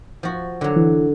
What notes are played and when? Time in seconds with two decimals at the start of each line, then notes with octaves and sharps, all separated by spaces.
0.23 F3 F#4
0.61 D3 F#3
0.76 E3